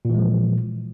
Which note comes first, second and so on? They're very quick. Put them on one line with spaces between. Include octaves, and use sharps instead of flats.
A#2 E3 G#3 F3